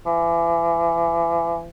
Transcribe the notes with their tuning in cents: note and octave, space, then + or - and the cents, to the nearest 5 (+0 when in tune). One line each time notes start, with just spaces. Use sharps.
E3 +35